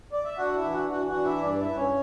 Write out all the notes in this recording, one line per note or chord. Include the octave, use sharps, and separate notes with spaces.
D5
E5
D4 F#4 F#5
E4 E5
E3
F#4 F#5
E3 F#4 F#5
F#4 F#5
D4
E4 E5
G2 D4 D5
E4 E5
G2 B4
C#4 C#5